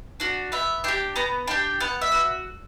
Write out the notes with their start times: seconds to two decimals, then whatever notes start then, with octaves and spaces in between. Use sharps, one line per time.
0.20 D4 F#4
0.52 B3 E5
0.84 D4 G4 G5
1.16 B3 A#5
1.47 D4 G4 G5
1.80 B3 F#5
2.02 E5
2.12 F#4